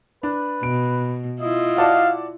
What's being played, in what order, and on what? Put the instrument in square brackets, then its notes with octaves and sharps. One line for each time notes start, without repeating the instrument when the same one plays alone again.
[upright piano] D4 [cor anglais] B4
[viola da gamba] B2 [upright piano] D7
[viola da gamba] E4 F4 [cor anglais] D#5
[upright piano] F#4 D5 A5 [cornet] F5